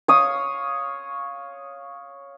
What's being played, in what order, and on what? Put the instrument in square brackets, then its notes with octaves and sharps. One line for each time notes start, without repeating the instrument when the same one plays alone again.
[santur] C#5 F5 D#6